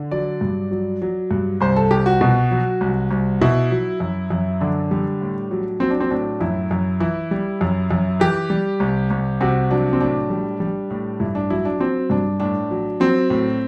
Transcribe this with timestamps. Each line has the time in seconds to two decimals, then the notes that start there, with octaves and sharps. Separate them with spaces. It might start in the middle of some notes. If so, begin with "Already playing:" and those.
Already playing: D3
0.11 F#3 D5
0.41 G2
0.71 F#3
1.02 F#3
1.31 G2
1.61 C2 C5
1.76 A4
1.91 C2 G4
2.06 F#4
2.21 B2
2.51 F#3
2.81 C2
3.11 C2
3.41 B2 E4
3.71 F#3
4.00 F#2
4.30 F#2
4.60 D3 D4
4.91 G3
5.21 A2
5.51 F#3
5.80 F#3 C4
5.90 D4
6.00 C4
6.11 A2 D4
6.41 F#2 E4
6.71 F#2
7.00 E3 E4
7.31 G3
7.61 F#2
7.91 F#2
8.20 E3 G4
8.50 G3
8.80 C2
9.10 C2
9.40 C3 F#4
9.71 F#3 D4
9.93 C4
10.00 A2 D4
10.30 G3
10.60 G3
10.90 A2
11.20 G2 E4
11.35 D4
11.50 F#3 E4
11.65 D4
11.80 F#3 C4
12.10 G2 D4
12.40 A2 D4
12.71 F#3
13.00 F#3 C4
13.30 A2